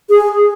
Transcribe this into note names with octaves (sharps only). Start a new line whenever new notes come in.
G#4